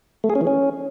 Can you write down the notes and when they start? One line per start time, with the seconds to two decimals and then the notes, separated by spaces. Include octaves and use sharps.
0.24 A3
0.30 G#4
0.35 C#4
0.41 E3
0.47 C#4